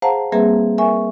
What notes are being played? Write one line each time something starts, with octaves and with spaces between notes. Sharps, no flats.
G#4 C5 F5 F#5 A5 A#5
G3 A#3 C4 G#4 B4 E5
A#4 E5 G#5 C#6